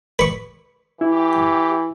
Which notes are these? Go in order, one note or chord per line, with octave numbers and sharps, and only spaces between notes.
B4 C#6
E3 E4 G4